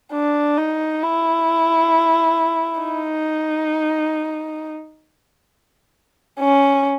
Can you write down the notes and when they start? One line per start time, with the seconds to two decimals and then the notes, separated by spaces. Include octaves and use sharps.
0.13 D4
0.57 D#4
1.03 E4
2.81 D#4
6.40 C#4